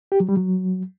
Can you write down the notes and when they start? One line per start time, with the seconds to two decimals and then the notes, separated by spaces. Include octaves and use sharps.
0.12 G4
0.20 F#3
0.29 G3
0.37 F#3